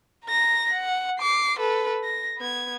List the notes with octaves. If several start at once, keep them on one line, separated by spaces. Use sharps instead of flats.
A#5 A#6
F#5
D6 C7
A4 B4
A#6
B3 G#6